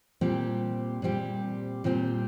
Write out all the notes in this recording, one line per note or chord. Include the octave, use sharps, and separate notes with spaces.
A#2 G3 C4 G4
A#2 G3 C4 G4
A#2 G3 C4 G4